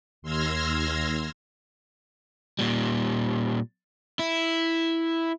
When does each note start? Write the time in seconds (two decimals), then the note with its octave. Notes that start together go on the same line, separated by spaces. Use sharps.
0.22 D#2 C6 E6 F6 G#6 A#6
2.59 A#2 G3
4.19 E4